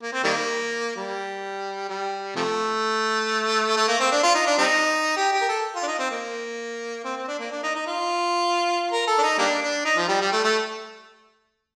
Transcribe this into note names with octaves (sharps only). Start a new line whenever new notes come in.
A#3
C4
D#3 G3 A#3
G3
G3
C3 F3 A3
A3
A#3
C4
D4
F4
D#4
D4
G3 C4 D#4
G4
G4
A#4
A4
F4
D4
D#4
C4
A#3
C4
C4
D4
A#3
D4
D#4
D#4
F4
A#4
A4
D4
D#4
G3 A#3 D4
D4
D#4
F3
G3
G3
A3
A3